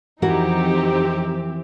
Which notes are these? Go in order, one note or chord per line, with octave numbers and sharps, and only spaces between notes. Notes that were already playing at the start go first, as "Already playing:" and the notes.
F2 E3 C4 D#4 F#4 G4 A#4